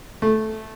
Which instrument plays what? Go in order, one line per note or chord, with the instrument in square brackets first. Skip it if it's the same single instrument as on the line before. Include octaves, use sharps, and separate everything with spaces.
[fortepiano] A3